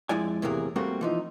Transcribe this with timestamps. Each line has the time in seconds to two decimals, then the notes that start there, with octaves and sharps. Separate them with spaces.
0.09 F2 F3 G#3 E4 D5 G#5
0.42 E2 A2 C3 E3 A#3 G#4
0.76 G3 A3 A#3 C4 F#4
1.01 E3 F3 D#4